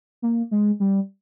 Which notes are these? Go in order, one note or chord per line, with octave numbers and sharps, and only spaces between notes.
A#3
G#3
G3